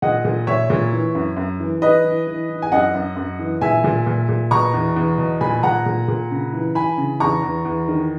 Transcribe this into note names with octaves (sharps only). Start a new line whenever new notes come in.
A#2 D#5 F#5
A#2
A#2 C#5 E5
A#2
E3
F#2
F#2
E3
E3 B4 D#5
E3
E3
E3
G#5
F#2 D#5 F#5
F#2
F#2
E3
A#2 E5 G#5
A#2
A#2
A#2
B2 A#5 C#6
E2
E2
B2
A#2 G#5 B5
A#2 F#5 A#5
A#2
A#2
C#3
E3
E3 G#5 B5
C#3
E2 A#5 C#6
E2
E2
D#3